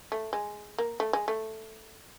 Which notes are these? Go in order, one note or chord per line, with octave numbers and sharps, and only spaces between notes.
A3
G#3
A#3
A3
G#3
A3